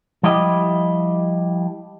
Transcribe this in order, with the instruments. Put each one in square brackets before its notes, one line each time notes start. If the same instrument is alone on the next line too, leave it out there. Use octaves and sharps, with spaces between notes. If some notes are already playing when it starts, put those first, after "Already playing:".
[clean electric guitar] F3 G3 E4 G4 D#5